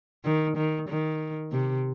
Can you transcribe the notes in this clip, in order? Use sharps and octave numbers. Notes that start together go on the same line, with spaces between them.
D#3
D#3
D#3
C3